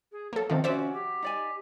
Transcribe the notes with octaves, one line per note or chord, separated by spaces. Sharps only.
G#4
F#3 A#3 A4
C3 D#3 F3 C4 A4
C#4 F#4 C5 D5 E5
G4
D#4 D5 G#5